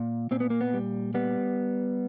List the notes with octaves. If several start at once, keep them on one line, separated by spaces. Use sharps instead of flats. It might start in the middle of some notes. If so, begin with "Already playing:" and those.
Already playing: A#2
A#2 C4
B3
A#3
B3
G3
G3 B3